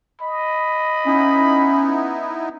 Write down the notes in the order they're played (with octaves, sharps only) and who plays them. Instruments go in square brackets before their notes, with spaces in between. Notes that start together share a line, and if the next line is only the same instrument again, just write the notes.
[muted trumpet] D#5 [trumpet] B5
[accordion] B3 D#4 E4 [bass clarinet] C#4